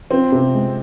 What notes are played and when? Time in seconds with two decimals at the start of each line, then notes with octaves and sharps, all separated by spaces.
0.10 F3 C4
0.32 C3
0.54 G#3